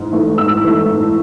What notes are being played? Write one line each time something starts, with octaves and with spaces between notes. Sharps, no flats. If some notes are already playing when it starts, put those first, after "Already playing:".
Already playing: G#2 E3
E3 A3
G#2 E6
E3 A3
G#2